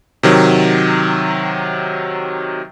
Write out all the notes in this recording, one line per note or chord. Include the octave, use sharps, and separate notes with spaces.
C3 D#3 F#3